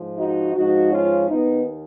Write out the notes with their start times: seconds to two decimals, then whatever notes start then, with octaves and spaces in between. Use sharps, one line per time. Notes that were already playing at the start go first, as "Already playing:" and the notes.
Already playing: G#2 F3
0.16 D#4 F#4
0.54 G#2 F3 D#4 F#4
0.92 C#4 F4
1.28 D#2 D#3 B3 D#4